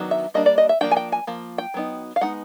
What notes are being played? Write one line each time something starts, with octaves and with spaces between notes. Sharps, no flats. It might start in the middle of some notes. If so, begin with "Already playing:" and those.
Already playing: D#3 F#3 B3 D4
E5
G3 A#3 D4 D#5
D5
D#5
E5
F3 A#3 D4 G5
G#5
G5
G#5
F3 A#3
G5
F#3 B3 D#4
F5
G#3 B3 D#4 F#5